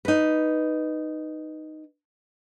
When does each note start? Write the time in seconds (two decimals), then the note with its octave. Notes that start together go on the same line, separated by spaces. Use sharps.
0.05 D#4 B4